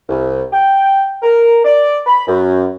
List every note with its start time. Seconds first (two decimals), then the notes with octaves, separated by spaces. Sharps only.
0.08 C2
0.52 G5
1.23 A#4
1.64 D5
2.06 B5
2.28 F#2